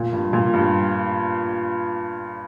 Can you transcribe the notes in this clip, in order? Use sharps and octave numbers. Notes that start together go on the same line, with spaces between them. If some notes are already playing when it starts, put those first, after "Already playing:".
Already playing: A#2
G2
A#2
G2